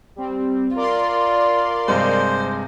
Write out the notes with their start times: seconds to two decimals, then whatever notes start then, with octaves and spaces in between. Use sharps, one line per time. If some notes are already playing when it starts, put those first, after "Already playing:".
0.16 G3 C4
0.76 F4 A#4 D5 C6
1.88 G2 C3 G#3 C5